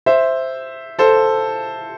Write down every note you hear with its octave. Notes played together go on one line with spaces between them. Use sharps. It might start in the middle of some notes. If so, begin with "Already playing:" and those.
C5 E5
A4 C5